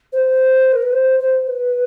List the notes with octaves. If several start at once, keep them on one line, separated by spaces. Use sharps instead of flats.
C5
A#4
B4
C5
C5
B4